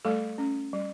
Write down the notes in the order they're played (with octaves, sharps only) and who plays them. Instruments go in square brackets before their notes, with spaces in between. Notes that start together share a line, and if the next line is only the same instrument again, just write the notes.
[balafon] G3 A3 A4
C#4
G3